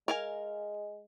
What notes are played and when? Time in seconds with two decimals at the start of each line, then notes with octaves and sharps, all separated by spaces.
0.08 G#3 A#4 F5 G#5